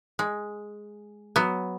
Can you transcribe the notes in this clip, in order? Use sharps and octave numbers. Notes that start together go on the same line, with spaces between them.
G#3
F#3 B3